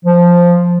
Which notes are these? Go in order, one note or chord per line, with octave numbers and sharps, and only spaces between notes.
F3